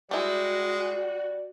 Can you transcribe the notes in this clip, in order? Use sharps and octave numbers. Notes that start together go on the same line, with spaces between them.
G3 G#3 E4 F#4 D5